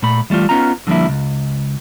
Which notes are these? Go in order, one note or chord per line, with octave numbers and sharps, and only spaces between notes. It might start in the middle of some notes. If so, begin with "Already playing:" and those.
A#2 A3 B5
E3 G3 A3 F4
B3 C#4 D#4 F4 A#5
D3 F3 G3 A#3 E4
C#2